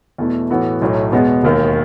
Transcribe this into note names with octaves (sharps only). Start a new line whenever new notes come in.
E2 B2 A3 E4
A2 E3 B3 F#4 A4
B1 A2 F#3 A3
E2 B2 G#3 B3
E1 D#2 D#3